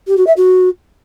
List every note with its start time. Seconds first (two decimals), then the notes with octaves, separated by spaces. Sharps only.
0.07 G4
0.17 F#4
0.27 E5
0.37 F#4